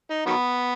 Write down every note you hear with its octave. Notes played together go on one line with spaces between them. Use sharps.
D#4
D#3 F#3 B3